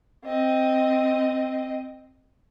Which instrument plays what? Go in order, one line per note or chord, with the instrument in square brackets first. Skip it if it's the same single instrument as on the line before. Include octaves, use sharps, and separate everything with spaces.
[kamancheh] C4 D#5